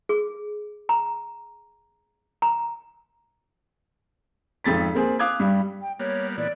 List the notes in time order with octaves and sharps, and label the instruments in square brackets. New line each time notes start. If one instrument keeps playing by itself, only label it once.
[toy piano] G#4
A#5
A#5
[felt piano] G#1 F2 A6 B6
A#3 C4 G#4
F5 D6 D#6 F#6 G#6
G2 G3
[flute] G5
[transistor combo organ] G3 A#3 B3 [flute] C#5
[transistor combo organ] A#2 E3 B3 [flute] D5